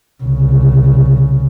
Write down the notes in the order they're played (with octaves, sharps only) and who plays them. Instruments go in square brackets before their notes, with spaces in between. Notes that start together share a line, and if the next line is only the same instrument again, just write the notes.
[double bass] C2 C#3